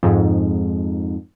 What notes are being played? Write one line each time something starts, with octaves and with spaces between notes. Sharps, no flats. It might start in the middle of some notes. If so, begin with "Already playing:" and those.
F2 G#2